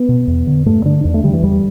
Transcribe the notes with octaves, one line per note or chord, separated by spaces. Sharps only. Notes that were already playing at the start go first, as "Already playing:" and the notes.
Already playing: B3
B2
E2
D3
G2 A3
D3 D4
E2 D4
A3
D3 G3
E3
E2 G3